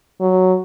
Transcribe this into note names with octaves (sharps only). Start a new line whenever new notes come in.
F#3